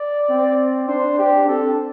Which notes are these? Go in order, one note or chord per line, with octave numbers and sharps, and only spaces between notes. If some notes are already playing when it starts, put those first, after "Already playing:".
Already playing: D5
C4
D4 C5
G4
C4 A4